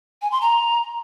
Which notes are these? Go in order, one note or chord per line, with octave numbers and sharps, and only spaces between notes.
G#5
C6
A#5